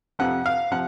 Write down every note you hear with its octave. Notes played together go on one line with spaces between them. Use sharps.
F2 C3 F3 F#5
F5
C3 F3 F#5